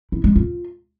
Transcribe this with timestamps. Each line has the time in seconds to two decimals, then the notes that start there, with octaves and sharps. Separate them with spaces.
0.12 E4
0.24 G#3
0.36 F4